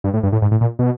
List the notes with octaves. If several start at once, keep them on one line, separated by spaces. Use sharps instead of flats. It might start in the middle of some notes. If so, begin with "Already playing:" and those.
G2
A2
G2
A2
G#2
A2
A#2
B2